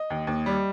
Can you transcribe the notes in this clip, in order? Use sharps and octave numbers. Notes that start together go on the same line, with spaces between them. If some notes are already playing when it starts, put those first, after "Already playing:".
Already playing: D#5
D#2
D#2
G3